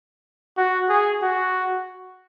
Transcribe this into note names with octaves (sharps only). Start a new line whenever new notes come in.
F#4
G#4
F#4